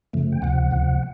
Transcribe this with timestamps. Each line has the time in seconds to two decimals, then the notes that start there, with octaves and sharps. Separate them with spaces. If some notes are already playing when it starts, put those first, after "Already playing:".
0.13 F#2 C#3 F3 A3
0.32 G5
0.42 D2 C3 F3 F#5
0.71 D2 C3 F3